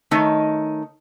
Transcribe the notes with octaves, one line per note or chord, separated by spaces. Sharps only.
D#3 A3 D#4 C#5